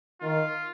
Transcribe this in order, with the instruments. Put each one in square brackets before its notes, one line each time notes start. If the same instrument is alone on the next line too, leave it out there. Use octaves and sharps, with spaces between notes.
[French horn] D#3 [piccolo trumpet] F4